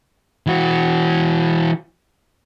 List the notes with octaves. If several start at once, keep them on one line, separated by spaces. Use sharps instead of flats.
E3 F#4